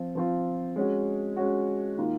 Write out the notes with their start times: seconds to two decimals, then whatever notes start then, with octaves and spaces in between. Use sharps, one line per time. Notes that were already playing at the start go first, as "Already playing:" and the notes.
Already playing: F3 C4 F4
0.15 F3 C4 F4
0.76 G#3 C#4 F#4
1.36 G#3 C#4 F#4
1.97 D#3 A#3 F4